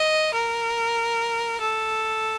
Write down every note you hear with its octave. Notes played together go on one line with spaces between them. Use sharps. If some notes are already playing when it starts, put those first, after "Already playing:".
Already playing: D#5
A#4
A4